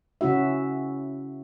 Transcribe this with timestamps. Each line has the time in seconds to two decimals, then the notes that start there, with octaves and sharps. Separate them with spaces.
0.21 C#3 C#4 E4 F#4 E5